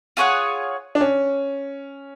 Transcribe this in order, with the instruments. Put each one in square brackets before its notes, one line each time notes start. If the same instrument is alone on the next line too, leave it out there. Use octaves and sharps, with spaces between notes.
[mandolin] F4 G#4 C#5 F#5
[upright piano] D4
C#4